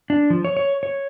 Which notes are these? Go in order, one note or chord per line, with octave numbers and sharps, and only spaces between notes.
D4
F3
C#5
C#5
C#5